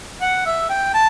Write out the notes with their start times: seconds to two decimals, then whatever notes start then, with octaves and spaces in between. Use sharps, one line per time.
0.22 F#5
0.46 E5
0.69 G5
0.94 A5